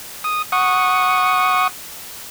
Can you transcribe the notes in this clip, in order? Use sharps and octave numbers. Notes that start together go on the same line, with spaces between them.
D#6
F#5 C#6 D#6